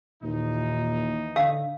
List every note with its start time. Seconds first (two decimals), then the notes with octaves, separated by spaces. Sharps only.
0.23 D#2 A#2 E3 D#4
1.36 D3 F5